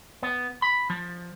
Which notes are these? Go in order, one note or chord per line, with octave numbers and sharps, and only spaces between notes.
B3
B5
F3